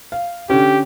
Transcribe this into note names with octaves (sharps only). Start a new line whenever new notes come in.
F5
D3 C#4 G4